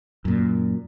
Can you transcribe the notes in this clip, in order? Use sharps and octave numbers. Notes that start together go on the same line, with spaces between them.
F#2 A#2